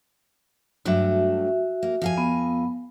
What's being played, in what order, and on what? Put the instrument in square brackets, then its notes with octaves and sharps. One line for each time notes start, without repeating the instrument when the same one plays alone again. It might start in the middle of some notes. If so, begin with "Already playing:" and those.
[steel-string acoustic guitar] G2 F#3 A3 [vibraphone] F#4 E5
[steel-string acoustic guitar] A#3
F2 F5 G#5
[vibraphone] B3